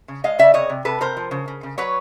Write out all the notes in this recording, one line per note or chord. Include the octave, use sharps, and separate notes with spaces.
C#3
G#3 D#5 F5
C#3 D5 E5
C3 C#5 D#5
C3
C3 A4 B4
C3 A#4 C5
F3
C#3
C#3
C#3
F#3 B4 C#5